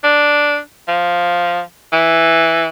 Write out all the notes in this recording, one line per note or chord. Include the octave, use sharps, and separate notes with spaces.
D4
F3
E3